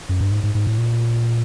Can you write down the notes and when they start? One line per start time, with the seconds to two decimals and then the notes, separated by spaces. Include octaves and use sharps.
0.09 F#2
0.21 G2
0.31 G#2
0.44 G#2
0.55 G#2
0.67 A2
0.78 A#2